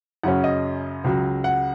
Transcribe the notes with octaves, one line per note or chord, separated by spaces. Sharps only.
F#2 C#3 F#3 C#4 F#5
D#5
C#2 C#3 F#3
F#5